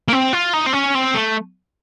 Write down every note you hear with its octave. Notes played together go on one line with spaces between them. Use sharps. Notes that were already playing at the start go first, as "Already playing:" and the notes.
A#3
C4
F4
D#4
C4
C#4
C4
A3